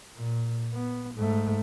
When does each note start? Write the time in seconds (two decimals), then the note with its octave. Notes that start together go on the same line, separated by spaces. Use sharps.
0.16 A#2
0.74 B3
1.15 G#2 A3